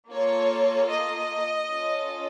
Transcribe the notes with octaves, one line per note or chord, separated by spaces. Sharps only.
A#3 F4 A4 C#5
D#5
C#4 F4 A4